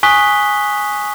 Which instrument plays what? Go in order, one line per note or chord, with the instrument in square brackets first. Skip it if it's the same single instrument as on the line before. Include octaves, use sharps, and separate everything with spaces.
[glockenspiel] G#5 C#6 D#6 F#6 B6 G7